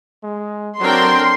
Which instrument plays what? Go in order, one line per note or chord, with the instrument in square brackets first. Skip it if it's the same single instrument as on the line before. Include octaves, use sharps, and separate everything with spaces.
[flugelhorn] G#3
[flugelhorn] F#3 [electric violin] C4 A#4 [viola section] D4 A4 G5 [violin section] C6